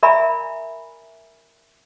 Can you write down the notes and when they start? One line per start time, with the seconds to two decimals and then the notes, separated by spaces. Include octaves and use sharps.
0.03 A#4 D5 E5 G#5 A#5 B5